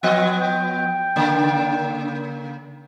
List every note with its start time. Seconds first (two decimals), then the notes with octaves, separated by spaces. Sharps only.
0.03 F3 B3 D#5 F#5
0.40 G5
1.16 C#3 A#3